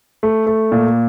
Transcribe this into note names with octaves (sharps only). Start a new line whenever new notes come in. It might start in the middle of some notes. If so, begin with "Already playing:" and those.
A3
A3
A#2